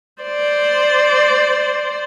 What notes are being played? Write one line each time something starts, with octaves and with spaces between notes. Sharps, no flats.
C5 D5